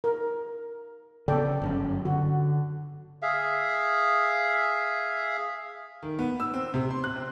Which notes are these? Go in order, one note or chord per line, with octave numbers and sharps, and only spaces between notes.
A#4
C#3 B3 A4 D5 G5
G1 F#2 C#4
D3 F#4
G#4 E5 F5
D#3
B3
E6
C4
C3
C6
F#6
C4